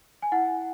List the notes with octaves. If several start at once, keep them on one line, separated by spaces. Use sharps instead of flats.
G#5
E4 F#5